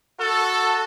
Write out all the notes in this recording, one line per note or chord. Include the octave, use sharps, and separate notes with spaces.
F#4 A4